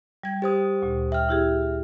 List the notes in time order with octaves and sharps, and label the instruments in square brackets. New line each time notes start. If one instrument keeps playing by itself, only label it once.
[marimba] G3 G#6
[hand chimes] G4 C5 D#6
[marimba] D2 A#2
[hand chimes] E5 F6 [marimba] G5
[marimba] E4 G4 G#4